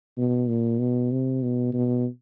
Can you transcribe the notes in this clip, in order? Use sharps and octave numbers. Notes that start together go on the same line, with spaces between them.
B2
A#2
B2
C3
B2
B2